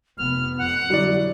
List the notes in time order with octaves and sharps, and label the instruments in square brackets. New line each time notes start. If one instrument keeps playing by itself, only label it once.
[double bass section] F1 B3 [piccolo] F6
[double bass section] F2 [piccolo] F#5
[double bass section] D3 F#3 [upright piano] G3 E4 D5